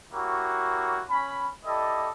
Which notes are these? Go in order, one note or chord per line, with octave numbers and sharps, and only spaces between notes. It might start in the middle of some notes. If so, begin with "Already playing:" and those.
A#3 E4 F#4 G4 C#5
C#4 B5
E4 G4 A4 D5 D#5